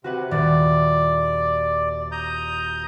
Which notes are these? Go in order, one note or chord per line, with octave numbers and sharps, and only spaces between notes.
C3 F#4 B4 F#5
D#1 D5 A6
A#5 D#6 G6